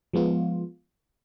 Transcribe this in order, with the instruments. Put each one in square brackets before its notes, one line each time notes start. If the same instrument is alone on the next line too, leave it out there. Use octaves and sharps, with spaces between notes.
[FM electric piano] F3 G#3 B3 F4